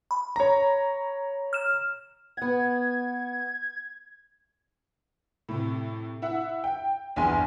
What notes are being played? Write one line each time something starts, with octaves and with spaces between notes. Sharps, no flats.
B5
C#5 A#5
F6 E7
B3 F#5 G#6
A2 C3
E4 E5 F#5
G5
A#1 E2 G2 G#5 C6 D#7